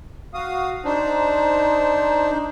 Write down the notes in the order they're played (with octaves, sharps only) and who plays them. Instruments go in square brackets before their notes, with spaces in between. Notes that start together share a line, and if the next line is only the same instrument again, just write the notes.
[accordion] F#4 F5 D#6
[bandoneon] D4 [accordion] D#4 C5